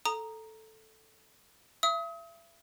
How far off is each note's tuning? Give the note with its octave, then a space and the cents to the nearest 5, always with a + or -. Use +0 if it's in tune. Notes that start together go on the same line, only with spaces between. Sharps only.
A4 +0 A#5 +0 D#6 -10
E5 +35 D#6 +40